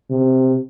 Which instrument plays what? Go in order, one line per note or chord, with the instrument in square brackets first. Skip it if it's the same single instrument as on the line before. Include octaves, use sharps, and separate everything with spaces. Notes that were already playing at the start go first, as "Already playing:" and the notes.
[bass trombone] C3